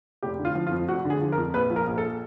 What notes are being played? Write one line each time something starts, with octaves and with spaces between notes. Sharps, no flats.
F1 G4
D3
F4
F3
F4
F2
F1 F#4
D3
G#4
F3
A#4
F2
A#1 B4
F3
A#4
A#1
A4